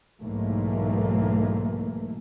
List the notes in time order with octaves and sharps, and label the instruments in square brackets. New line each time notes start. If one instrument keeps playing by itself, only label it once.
[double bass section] B1 G#2 E3 A3 A#3